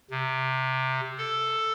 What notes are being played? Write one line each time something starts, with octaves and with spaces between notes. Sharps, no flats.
C3
A4